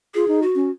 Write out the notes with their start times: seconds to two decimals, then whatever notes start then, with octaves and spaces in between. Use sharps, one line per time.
0.14 F4 G#4
0.28 D#4
0.42 F#4
0.55 C#4